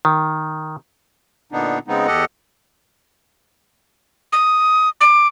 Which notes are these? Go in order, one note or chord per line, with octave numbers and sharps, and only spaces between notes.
D#3
A#2 D3 B3 D4 D#4
C#3 G#3 B3 C4 D#4
E2 G4 A4 D#5 F#5
D#6
D6